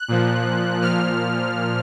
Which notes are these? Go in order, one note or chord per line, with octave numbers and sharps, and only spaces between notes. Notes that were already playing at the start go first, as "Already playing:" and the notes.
Already playing: F#6
A#2 F3
A#2 F3 F6